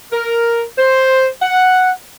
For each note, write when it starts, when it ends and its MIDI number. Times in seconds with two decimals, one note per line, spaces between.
0.13 0.63 70
0.78 1.27 72
1.42 1.91 78